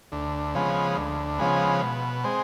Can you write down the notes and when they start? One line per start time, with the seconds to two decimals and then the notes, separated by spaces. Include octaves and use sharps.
0.12 D2
0.55 C#3 F3 G#3 B3
0.97 D2
1.39 C#3 F3 G#3 B3
1.82 B2
2.24 G#3 C4